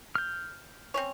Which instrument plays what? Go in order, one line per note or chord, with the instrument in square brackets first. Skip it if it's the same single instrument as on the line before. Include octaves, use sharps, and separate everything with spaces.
[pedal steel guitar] F6 G6
[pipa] C4 C#4 C#5